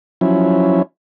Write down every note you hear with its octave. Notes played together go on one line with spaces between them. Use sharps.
F3 F#3 C#4 E4